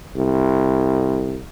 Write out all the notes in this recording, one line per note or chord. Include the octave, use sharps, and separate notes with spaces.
C2